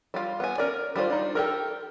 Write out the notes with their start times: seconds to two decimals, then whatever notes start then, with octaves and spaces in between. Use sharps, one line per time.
0.14 G3 F4
0.40 B3 G#5
0.58 C#4 A#4 D5
0.96 G3 D4 F4 C5
1.10 D4 D#4
1.35 G4 A4 A#4